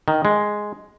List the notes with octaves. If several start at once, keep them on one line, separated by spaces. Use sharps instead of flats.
D#3
G#3